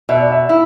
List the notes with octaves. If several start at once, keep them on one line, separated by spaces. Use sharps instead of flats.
B2 E5
D5
E5
E4